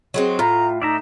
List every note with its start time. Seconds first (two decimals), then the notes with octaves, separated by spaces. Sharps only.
0.14 F#3 G#3 C4
0.39 A2 F4 A#5
0.82 D#4 D5 E5 A#5